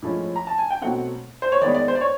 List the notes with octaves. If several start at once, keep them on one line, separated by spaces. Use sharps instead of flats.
A2 F3 G#3 C#4
A#5
A5
G#5
G5
B2 F#3 A3 C4 F#5
C5
C#5
D#3 G#3 B3 D5
D5
C5
D5
C#5